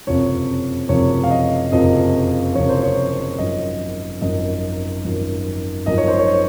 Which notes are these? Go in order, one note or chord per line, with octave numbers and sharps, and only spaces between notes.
F#1 F2 C3 F3 C#5
F#1 F2 C3 F3 C#5
F5
D#5
F#1 F2 C3 F3 D#5
F#1 F2 C3 F3 C#5
C5
C#5
G#1 F#2 F3 D#5
G#1 F#2 F3 D#5
G#1 F#2 F3
G#1 F#2 F3 D#5
C#5
C5
C#5